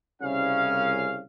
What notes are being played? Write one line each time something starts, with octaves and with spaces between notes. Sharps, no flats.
C2 C#3 C#4 F5